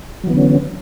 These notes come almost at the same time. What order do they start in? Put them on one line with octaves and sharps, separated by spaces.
F#3 E3 B3 D3 C#4